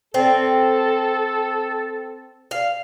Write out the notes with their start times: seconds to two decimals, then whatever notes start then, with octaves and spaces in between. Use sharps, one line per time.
0.14 C4 A4
2.51 F5